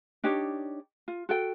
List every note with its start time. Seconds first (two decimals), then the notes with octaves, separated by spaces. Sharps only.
0.24 D4 D#4 G4 C#5
1.08 F4
1.29 F#4 A4 G5